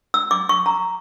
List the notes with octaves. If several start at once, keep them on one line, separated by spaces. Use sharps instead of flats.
E6
D6
C#6
A#5